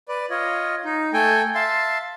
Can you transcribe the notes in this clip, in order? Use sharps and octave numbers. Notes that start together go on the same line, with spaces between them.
B4 D5
F4 C#5 D#5
D#4
A3 A4 G5 G#5
E5 F5 A5 C6